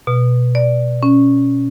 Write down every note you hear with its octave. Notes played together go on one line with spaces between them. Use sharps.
B2
D5
C#4